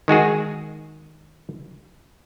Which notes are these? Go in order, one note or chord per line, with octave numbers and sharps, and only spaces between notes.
D#3 G#3 F#4 G#4